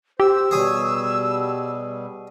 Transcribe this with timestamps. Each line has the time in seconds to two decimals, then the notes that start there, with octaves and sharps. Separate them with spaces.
0.20 G4 C5 E6
0.51 B2 G3 G#4 C#5